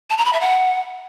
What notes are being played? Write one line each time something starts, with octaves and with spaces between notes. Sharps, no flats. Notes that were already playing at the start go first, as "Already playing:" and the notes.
A5
A#5
B5
E5
F#5